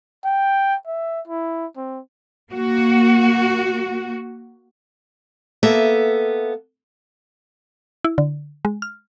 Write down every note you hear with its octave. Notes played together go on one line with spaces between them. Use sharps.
G5
E5
E4
C4
A#3 F#4
A#3 B3 A4 E5
E4
D3
G#3
F6